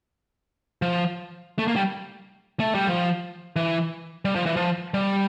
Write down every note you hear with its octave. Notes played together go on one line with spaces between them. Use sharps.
F3
A3
A#3
G3
A3
G3
F3
E3
G3
F3
E3
F3
G3